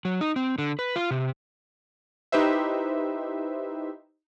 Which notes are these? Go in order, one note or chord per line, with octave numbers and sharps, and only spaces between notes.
F#3
D#4
C4
D3
B4
F4
C3
D#4 E4 G4 B4 C5 E5